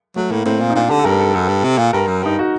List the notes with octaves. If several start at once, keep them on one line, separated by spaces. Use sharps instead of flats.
F#3 A3
A2 A#3
A2 C4
A#2
D#4
A#2 D4
D3 G4
A4
G2 A#4
A4
F#2 A4
G2
C3
A#2
G2 A#4
F#2
G2 D#4
F#4